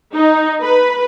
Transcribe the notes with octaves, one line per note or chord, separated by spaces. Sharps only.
D#4
B4